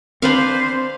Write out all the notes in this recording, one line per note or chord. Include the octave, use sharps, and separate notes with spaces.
C4 D4 B4 C5 F5